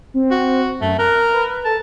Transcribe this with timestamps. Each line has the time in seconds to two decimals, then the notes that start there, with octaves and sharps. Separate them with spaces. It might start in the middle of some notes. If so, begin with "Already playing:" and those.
0.14 C4
0.31 F#4
0.81 F#2 A3
0.99 A#4 F#6
1.33 B4
1.65 A4 A5